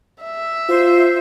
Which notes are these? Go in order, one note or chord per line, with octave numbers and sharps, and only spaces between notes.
E5
F4 C5